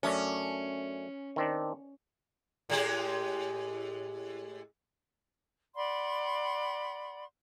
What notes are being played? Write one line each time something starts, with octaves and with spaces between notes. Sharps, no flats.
F#2 A3 C#4 D4
D#3 C4 D4
A2 G#3 G4
D5 F#5 B5 C6